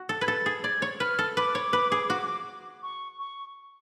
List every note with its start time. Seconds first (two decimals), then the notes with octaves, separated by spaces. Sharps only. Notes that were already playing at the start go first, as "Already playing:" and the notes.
Already playing: F#4
0.09 A4
0.21 B4 G#6
0.27 A4 A6
0.46 G#4
0.64 D5 G#6
0.82 C#5
1.00 B4 F6
1.19 A4
1.37 B4 D6
1.55 C#5
1.73 B4
1.92 G#4
2.10 F#4
2.83 C#6
3.19 C#6